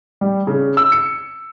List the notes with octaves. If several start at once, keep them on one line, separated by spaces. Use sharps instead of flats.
G3
C#3
E6
C#7